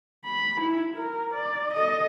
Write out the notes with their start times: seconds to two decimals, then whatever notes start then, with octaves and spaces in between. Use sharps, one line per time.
0.25 B5
0.61 E4
0.97 A#4
1.34 D5
1.74 A4 D#5